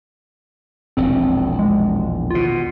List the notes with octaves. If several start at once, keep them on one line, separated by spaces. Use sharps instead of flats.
E1 A#1 D#2 C4
G#3
D#2 B2 F4